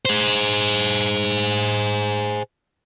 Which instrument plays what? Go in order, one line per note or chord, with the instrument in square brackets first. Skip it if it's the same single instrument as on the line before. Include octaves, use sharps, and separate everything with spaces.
[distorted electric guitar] G#4 C5